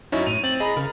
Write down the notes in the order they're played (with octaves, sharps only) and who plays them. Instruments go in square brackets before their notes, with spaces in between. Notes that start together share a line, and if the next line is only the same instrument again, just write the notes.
[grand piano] F#2 D#4 C#5 [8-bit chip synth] C#4 E4
[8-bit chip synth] A2 [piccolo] D#7 [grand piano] F7
[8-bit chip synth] C4 [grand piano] A6 [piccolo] F#7
[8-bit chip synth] G#4 A#5 [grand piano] D#5 [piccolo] B5
[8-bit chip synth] C#3 [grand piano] A#4